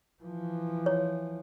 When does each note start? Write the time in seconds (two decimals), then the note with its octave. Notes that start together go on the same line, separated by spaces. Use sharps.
0.23 E3 F3
0.86 C#5